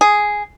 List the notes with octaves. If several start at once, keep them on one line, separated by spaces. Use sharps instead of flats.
G#4